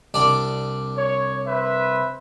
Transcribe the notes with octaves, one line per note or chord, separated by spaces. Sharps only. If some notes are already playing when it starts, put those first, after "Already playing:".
C2 D4 D5
C#5
B4 C5 E5